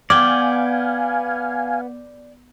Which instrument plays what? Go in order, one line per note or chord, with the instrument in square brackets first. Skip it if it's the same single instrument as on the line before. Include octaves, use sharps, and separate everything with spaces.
[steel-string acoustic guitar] B3 [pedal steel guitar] D5 G5 [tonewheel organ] F5 G#5 [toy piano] D6